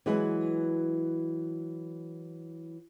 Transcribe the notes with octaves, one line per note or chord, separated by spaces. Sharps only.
E3 F#3 G#3 E4 B4